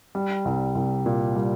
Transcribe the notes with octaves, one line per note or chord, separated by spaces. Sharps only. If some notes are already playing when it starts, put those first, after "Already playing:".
G3
C2
C2
A#2
G3